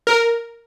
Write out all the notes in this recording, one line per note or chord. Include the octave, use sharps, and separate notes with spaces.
A#4